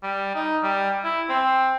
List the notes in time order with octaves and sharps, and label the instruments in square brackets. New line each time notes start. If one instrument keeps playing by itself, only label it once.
[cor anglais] G3
D#4
G3
E4
C4